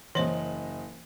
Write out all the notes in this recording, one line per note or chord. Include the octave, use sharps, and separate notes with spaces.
F#1 E3 C5 D#5 F#7